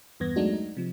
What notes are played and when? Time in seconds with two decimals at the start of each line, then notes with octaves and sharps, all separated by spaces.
0.20 E2 G2 B3 G#6 A#6
0.36 F#3 G#3 A3 D4 D#4 F#4
0.53 D#4
0.77 C3 F3